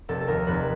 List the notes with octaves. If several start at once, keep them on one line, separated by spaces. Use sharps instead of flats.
F1 A4
A4
D#2 A#4
F1 B4